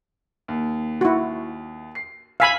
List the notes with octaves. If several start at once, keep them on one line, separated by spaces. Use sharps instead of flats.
D#2
E4 F#4
C7
F5 G#5 B5 E6 B6 C7